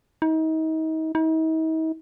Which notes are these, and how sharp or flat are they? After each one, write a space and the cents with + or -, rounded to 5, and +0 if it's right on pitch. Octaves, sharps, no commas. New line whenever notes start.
D#4 +35
D#4 +45